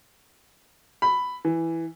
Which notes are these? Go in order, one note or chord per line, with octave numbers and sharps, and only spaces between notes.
B5
E3